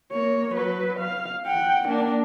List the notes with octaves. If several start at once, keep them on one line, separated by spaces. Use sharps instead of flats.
A#3 C#5
F#3 B4
F5
F#5 G5
A#3 D4